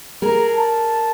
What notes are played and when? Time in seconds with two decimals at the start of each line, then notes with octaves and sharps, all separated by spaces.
0.22 G#4 A#4 A#5
0.53 A5